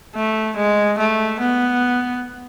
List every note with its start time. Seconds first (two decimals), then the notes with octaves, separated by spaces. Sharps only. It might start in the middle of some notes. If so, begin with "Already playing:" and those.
0.15 A3
0.57 G#3
0.98 A3
1.40 B3